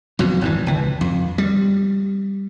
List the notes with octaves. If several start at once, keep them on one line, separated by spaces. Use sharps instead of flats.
F2 B2 F#3
G#1 G#2 E3
C#2 E3
F2
G3